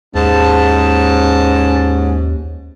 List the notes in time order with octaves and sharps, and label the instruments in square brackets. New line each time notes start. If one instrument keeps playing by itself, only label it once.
[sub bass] D#2 [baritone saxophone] G#2 [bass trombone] C#4 [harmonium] A5